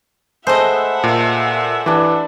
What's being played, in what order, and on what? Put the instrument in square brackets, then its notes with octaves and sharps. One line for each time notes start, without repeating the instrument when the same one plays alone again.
[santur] G#3 A3 B4 [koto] C5 D#5 [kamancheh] E5 F#5
[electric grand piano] A#2
[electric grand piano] E3 [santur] D4 G4